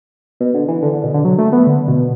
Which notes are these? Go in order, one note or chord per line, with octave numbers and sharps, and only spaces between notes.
B2
D3
E3
D3
D3
B2
D3
F#3
A3
B3
D3
B2